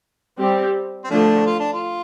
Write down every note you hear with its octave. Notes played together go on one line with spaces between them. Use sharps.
G3 C4 G4
C4
D3 F3 A3 D4
F4
D4
F4